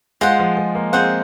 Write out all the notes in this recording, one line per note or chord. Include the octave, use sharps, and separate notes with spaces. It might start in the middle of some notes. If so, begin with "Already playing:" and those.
G#3 F4 G#4 C5 F#5
F3
G#3
A#3
C4 F4 G#4 C5 F#5